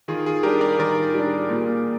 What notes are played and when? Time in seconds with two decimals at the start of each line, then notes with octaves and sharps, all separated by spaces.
0.08 D#3 F4 G#4
0.26 F4 G#4
0.43 G3 D4 G4 A#4
0.61 A#4 D5
0.79 D#3 A#4 D5
1.14 G3 D4
1.50 A#2